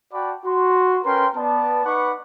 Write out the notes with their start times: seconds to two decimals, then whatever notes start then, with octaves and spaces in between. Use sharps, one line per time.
0.13 F#4 D5 F#5 G5 A5 B5
0.46 F#4 C6
1.05 C#4 A#4 B4 G5 C6
1.36 B3 D5 A5
1.85 D#4 B4 F#5 B5 C#6 D6